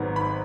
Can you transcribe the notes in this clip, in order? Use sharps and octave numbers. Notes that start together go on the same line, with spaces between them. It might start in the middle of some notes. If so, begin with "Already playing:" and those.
Already playing: G#1 G#2 F#3 B3
B5